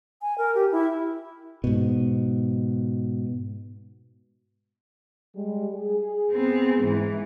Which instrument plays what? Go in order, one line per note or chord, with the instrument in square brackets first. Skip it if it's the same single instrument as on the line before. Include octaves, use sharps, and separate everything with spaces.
[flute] G#5
A#4
G4
E4
[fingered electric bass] G#2 B2
[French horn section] G3 G#3
G#4
[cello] B3 C4
G#2 E3